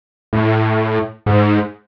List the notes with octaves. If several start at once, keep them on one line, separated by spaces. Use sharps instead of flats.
A2
G#2